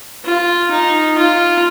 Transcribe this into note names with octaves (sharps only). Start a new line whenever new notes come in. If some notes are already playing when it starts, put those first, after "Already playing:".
F4
D#4
F4